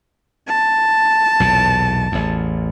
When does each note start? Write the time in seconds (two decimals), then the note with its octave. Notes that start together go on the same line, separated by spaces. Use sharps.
0.49 A5
1.40 B1 E2 A#2
2.12 A1 E2